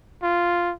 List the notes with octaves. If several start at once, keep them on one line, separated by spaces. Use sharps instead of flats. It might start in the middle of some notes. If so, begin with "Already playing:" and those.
F4